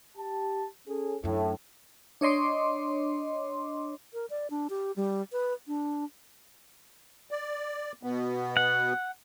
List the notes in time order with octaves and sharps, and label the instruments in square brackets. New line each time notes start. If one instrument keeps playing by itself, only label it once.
[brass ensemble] G4 A5
C#4 G#4 A4
[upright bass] F#2 D4 [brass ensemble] A2
[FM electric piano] D4 C#5 D#5 C6 D6
[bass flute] A#4
D5
D4
G4
G3
B4
D4
[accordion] D5
B2 B3
[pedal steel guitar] F#5